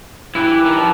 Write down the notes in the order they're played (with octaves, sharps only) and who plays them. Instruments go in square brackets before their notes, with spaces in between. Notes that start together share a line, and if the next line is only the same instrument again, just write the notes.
[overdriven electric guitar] E3 [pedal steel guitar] E4 G4 B4
[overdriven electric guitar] D#3
F3